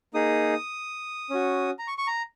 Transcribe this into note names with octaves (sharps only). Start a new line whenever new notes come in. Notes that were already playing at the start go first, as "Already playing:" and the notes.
A#3 D#4 G#4 D#6
C#4 F#4
A#5
C#6
C#6
A#5